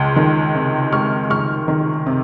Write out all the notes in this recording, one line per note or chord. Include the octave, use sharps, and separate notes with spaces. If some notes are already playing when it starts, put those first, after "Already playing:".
Already playing: C#2 G#3
D#3
C3
G#3 C#6 F6
C#2 C#6 F6
D#3
C3